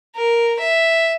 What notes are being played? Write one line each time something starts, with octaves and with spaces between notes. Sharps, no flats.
A#4
E5